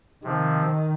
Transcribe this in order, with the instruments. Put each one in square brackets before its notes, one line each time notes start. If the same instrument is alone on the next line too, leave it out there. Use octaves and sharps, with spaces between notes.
[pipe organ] C3 F3 C4 [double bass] D#3